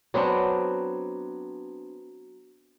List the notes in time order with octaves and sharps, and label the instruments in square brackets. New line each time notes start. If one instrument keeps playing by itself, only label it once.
[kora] F#3 B3 C4 D4